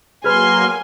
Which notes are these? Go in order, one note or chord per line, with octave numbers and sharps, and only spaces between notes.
F#3 A#3 G#4 B4 G#5 C6 F6